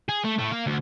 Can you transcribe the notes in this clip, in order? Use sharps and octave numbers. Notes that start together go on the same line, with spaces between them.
G#4
A3
A2 A3
A#4 F5
D2